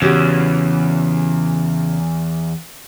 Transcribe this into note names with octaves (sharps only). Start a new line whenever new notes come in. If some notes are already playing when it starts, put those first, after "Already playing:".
E2 C#3 F#4 G4